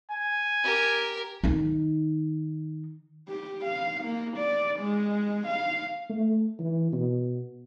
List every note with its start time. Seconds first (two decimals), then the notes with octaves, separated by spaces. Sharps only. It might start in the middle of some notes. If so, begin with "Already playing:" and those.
0.11 G#5
0.63 G4 A#4
1.44 D#3 D#4
3.29 G4
3.65 F5
4.04 A#3
4.37 D5
4.80 G#3
5.47 F5
6.09 A3
6.59 E3
6.92 B2